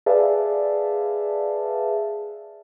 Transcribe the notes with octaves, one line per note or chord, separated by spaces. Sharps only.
G#4 B4 D5 E5 F5 A5